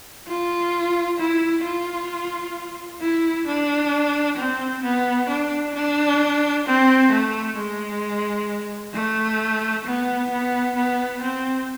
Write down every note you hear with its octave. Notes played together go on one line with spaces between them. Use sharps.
F4
E4
F4
E4
D4
C4
B3
D4
D4
C4
A3
G#3
A3
B3
B3
B3
C4